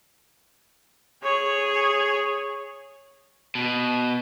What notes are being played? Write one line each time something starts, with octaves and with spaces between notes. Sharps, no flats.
G#4 C#5
B2